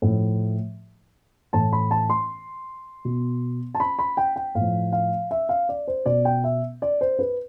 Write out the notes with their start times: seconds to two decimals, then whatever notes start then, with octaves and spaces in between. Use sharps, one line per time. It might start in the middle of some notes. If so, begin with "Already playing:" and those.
0.02 A2 F3
1.53 A2 E3 A5
1.73 B5
1.91 A5
2.10 C6
3.05 B2
3.75 A5
3.80 B5
3.99 B5
4.17 G5
4.36 G5
4.55 A2 F5
4.60 F3
4.92 F5
5.31 E5
5.49 F5
5.69 D5
5.88 C5
6.06 B2 D5
6.25 G5
6.44 E5
6.82 D5
7.01 C5
7.19 B4